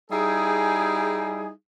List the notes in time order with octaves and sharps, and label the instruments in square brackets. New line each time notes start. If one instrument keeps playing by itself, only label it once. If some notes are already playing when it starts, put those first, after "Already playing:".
[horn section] G3 D#4 E4 G#4